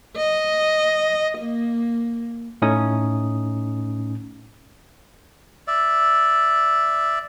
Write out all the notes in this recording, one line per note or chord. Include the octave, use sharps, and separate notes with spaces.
D#5
A#3
A2 A3 C#4 D#4 D#6
D5 E5